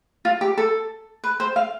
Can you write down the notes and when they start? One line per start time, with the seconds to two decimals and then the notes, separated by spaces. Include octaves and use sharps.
0.25 F4
0.41 G4
0.58 A4
1.24 B4
1.40 C5
1.56 F5